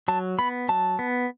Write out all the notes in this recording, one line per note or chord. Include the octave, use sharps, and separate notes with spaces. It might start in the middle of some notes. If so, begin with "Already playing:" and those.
F#3 A5
B3 B5
F#3 A5
B3